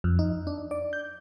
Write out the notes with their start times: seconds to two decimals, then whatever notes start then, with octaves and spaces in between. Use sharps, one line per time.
0.04 F2
0.19 D#4
0.47 D4
0.71 D5
0.93 G6